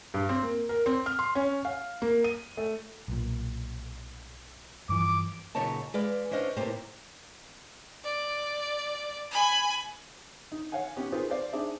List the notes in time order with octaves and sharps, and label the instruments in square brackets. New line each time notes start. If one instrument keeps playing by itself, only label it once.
[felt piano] G2
C4
A#3
A#4
C4
F6
C6
C#4
F5
A#3
D#7
A3
[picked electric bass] B1 A#2
[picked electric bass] G2 E3 F3 [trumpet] D6
[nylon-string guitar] F#2 A#2 C#3 D#4 C#5 A5
G#3 B4 D5 F5
C#4 D4 C5 D#5 F5
A2 C3 A#3 G4 C5
[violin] D5
G#5 B5
[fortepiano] D#4
C#5 F5 F#5 G#5
B3 C#4 D#4 G4
C4 D#4 F4 G#4 A#4 B4
C4 C5 D5 F5
C4 D4 D#4 G#4 E5